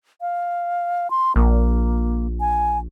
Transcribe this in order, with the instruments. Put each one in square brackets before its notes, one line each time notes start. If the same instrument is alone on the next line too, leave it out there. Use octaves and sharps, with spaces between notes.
[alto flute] F5
C6
[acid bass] A#1 [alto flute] A#3
[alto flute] G#5